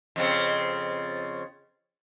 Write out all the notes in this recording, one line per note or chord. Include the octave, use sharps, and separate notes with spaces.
F2 C#3 C4